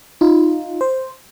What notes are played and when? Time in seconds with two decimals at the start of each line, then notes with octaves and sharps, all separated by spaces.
0.21 D#4 F4
0.81 C5